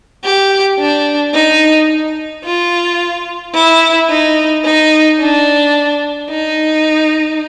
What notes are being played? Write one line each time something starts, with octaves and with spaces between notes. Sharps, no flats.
G4
D4
D#4
F4
E4
D#4
D#4
D4
D#4